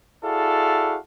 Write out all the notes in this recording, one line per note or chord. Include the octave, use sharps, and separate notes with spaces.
E4 F#4 G#4 A4 D5 F5